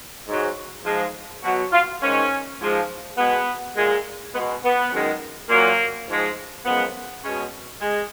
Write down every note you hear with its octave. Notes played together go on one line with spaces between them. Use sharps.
G#2 F#3
G#2 F3 G#3
B2 F#3 F#4
F4
G#2 D#3 G#3 C#4
G#2 F3 G#3
B2 G#3 B3
A#2 G#3
B2 G#3 B3
B3
F#2 D#3 G#3
A#2 F#3 A#3
G#2 F3 G#3
F#2 F3 G#3 B3
B2 G#3 C#4
G#3